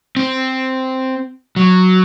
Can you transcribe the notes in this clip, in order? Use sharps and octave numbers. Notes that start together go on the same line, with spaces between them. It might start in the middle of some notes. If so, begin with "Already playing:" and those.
C4
F#3